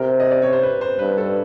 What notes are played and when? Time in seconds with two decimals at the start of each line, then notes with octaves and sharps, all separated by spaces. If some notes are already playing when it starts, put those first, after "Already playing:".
Already playing: C3 A#4
0.20 D#5
0.31 D5
0.42 C#5
0.53 C5
0.63 B4
0.81 C5
0.99 G2 B4
1.18 A4